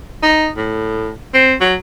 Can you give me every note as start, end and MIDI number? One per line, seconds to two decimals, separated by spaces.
0.22 0.48 63
0.57 1.10 45
1.34 1.54 60
1.61 1.74 54